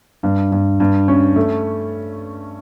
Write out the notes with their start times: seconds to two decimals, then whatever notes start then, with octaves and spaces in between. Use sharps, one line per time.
0.23 G2
0.52 G2
0.80 G2
1.08 C#4
1.36 A3